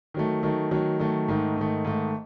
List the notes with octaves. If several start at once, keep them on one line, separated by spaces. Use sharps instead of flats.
D#3 F#3 A3
D#3 F#3 A3
D#3 F#3 A3
D#3 F#3 A3
G#2 D#3 A3
G#2 D#3 A3
G#2 D#3 A3